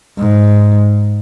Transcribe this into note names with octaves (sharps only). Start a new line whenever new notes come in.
G#2